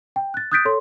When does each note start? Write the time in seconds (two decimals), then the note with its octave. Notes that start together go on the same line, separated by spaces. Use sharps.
0.16 G5
0.34 F#6 A6
0.52 D#6 F#6 G6 A6 B6 D7
0.65 A4 C#5 C6